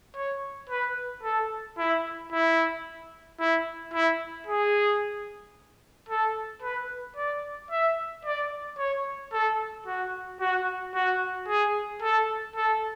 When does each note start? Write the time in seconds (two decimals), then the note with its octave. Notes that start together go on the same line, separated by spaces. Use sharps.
0.15 C#5
0.69 B4
1.23 A4
1.78 E4
2.32 E4
3.39 E4
3.94 E4
4.47 G#4
6.09 A4
6.63 B4
7.17 D5
7.71 E5
8.25 D5
8.78 C#5
9.33 A4
9.86 F#4
10.40 F#4
10.95 F#4
11.48 G#4
12.02 A4
12.56 A4